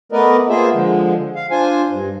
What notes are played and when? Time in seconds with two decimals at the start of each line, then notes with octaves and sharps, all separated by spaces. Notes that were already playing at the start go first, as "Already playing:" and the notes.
0.12 A3 B3 A#4 B4 D5 D#5
0.49 A#3 B3 F4 G#4 C5 E5
0.73 D3 F3 G#3
1.35 F5
1.51 D4 F4 C5 G#5
1.89 G2